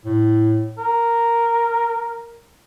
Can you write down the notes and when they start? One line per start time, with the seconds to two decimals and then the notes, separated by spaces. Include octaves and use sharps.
0.06 A2
0.78 A#4